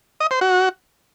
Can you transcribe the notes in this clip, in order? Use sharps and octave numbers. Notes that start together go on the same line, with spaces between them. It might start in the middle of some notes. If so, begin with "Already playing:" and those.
D#5
C5
F#4